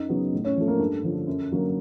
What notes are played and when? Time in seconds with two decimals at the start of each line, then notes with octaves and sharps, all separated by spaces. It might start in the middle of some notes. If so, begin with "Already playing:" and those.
Already playing: F#2 D#4 D#5
0.09 C#3 F#3 B3
0.33 A2
0.44 C#4 C#5
0.56 F3 A3
0.68 A#3 A#4
0.79 G2 A4
1.03 D3 F3
1.27 F#2
1.51 D3 F#3 A#3